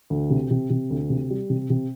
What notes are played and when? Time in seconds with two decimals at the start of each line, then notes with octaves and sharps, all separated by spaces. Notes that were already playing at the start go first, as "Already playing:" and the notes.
0.10 D2
0.30 C3
0.51 C3
0.70 C3
0.90 D2
1.10 C3
1.30 G3
1.50 C3
1.70 C3